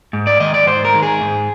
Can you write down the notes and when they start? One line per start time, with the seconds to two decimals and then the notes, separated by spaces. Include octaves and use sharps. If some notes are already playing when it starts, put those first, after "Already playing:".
0.13 G#2
0.27 D5
0.40 D#3 G#3 D#5
0.54 D5
0.66 G#2 C5
0.85 A#4
0.93 D#3 G#3
1.03 G#4
1.21 G#2